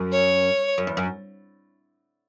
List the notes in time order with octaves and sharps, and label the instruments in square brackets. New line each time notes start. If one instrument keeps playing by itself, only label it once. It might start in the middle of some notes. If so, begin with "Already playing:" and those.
Already playing: [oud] F#2
[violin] C#5
[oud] F#2
E2
F#2